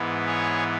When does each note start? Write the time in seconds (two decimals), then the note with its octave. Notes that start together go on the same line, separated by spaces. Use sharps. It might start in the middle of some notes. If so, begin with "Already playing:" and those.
Already playing: G#2 E3 B3
0.26 G#4 C#5